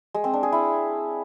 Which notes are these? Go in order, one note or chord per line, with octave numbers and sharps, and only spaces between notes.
G#3
C4
D4
G#4
E4